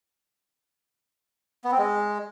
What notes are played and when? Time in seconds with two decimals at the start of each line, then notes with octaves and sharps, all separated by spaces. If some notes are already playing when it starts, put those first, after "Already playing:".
1.64 B3
1.71 C4
1.78 G#3